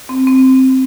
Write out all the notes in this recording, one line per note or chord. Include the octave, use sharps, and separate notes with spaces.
C4
C4